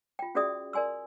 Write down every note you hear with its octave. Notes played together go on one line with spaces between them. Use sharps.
F4 G5
C#4 F#4 G#4 D5 E5 D#6
A#4 D5 G#5 C6 E6